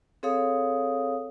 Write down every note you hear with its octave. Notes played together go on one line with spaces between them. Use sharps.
C4 G#4 A4 C#5 F5 D#6